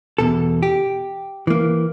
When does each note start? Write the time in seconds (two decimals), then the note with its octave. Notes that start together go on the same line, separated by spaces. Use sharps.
0.18 E2 B2 A4
0.63 G4
1.47 E3 A#3